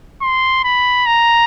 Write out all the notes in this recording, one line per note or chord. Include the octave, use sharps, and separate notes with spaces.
C6
B5
A#5